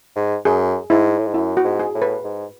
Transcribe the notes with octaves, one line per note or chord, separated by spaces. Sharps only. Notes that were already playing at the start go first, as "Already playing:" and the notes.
G#2
F#2 G#4
G#2 E4
A2
G#2
F#2 E4
F#4
G#2
G#4
A2
B4
G#2